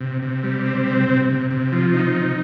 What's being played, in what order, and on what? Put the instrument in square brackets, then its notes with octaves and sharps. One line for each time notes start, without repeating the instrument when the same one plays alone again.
[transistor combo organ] C3
C3
G3
C4
C3
C3
C3
C3
F3
D#4
C3